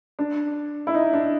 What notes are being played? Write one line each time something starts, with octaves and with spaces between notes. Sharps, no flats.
D4
E4
D#4
D4